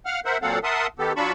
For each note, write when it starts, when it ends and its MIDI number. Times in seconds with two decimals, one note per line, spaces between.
0.06 0.20 77
0.06 0.20 78
0.06 0.20 89
0.25 0.37 70
0.25 0.37 72
0.25 0.37 76
0.25 0.37 78
0.42 0.59 46
0.42 0.59 54
0.42 0.59 60
0.42 0.59 69
0.42 0.59 77
0.42 0.59 78
0.64 0.87 70
0.64 0.87 76
0.64 0.87 78
0.64 0.87 81
0.64 0.87 84
0.64 0.87 87
0.99 1.13 51
0.99 1.13 59
0.99 1.13 67
0.99 1.13 69
1.16 1.32 54
1.16 1.32 62
1.16 1.32 65
1.16 1.32 81
1.16 1.32 83
1.16 1.32 85